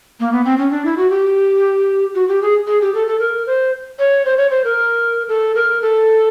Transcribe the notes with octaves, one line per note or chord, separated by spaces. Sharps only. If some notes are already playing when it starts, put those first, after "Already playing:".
A#3
B3
C4
C#4
D4
E4
F#4
G4
F#4
G4
G#4
G#4
G4
A4
A4
A#4
C5
C#5
C5
C#5
C5
A#4
A4
A#4
A4